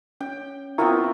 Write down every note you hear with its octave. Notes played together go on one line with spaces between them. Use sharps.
C#4 G5
B3 C4 E4 F4 A#4 A#5 C#6